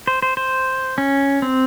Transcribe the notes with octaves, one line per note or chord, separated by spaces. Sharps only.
C5
C5
C5
C#4
C4